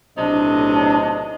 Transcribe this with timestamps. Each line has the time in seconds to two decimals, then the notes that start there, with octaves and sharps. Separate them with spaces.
0.18 B1 A2 C3 D4 D#5